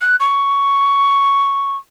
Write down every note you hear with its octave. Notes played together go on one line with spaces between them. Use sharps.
F#6
C#6